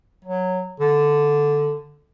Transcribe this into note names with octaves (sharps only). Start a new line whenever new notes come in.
F#3
D3